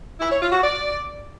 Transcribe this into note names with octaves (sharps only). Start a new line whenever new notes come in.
E4
C#5
F4
F#4
D5